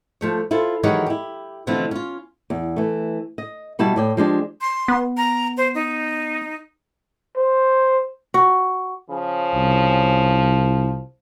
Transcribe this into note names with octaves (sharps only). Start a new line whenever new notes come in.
F3 A3 C#5
E4 F4 A4 C5
D#3 E3 F#3 G#3 G4 C#5
E4 G4
B2 D3 E3 F3 A3 C4
C#4 F4
E2
E3 A3
D#5
B2 G3 E4 F#4 A5
A2 D5 G5
F3 G#3 D4 G4
C6
B3
A#5
C5
D#4
C5
F#4
C#3 F3
C2